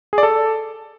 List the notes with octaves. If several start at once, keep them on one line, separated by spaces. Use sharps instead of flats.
G#4
D5
A4